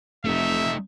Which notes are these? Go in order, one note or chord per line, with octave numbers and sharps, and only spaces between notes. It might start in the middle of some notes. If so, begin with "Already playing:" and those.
F1 A3 D#4 E5